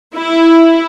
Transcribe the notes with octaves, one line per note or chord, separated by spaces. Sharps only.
E4